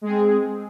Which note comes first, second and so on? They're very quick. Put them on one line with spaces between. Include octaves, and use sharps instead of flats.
G#3 G#4 C4